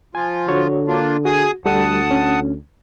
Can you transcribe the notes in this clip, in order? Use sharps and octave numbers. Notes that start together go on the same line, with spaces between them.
F3 F4 G#5
D3 F#4 C#5
A#3 D4 F4
F#4 G#4 G#5 D#6
D2 G3 A4 F#5 A5 D#6
C#4